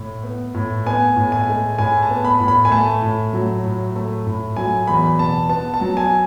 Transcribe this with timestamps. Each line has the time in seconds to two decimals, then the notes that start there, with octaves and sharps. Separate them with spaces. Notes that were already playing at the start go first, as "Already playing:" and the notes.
Already playing: A2
0.24 B3
0.54 A2
0.86 B3 G#5
1.16 A2
1.32 G#5
1.48 G#3
1.79 A2 G#5
2.02 A5
2.10 B3
2.25 B5
2.40 A2
2.48 B5
2.65 G#5
2.71 A3 A5
3.02 A2
3.33 F#3
3.64 A2
3.96 A3
4.27 A2
4.56 F#3 G#5
4.87 E2 B5
5.19 B2 A5
5.49 B3 A5
5.74 A5
5.81 F#3
5.97 G#5